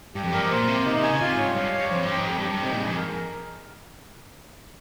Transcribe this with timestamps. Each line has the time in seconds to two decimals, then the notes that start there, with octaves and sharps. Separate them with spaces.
0.15 G2 G4
0.23 F2
0.32 G2 A#4
0.42 G#2
0.51 A#2 C5
0.67 C3 A#3
0.85 C3 D#4
0.97 C3
1.03 C#3 G#5
1.13 C#3
1.21 C3 F4
1.33 G#2
1.38 C#5
1.44 G2
1.56 G2 F5
1.73 C#5
1.79 G2
1.91 F2 C5
2.04 G2
2.09 G#2 G5
2.26 F2 G4
2.38 G2
2.44 G4
2.49 G2
2.62 C3 D#4
2.71 A#2
2.80 G2 G#4
2.87 F2
2.97 A#4